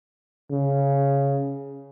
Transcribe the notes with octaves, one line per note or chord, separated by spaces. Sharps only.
C#3